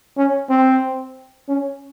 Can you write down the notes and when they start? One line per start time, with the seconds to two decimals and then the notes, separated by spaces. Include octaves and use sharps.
0.17 C#4
0.49 C4
1.48 C#4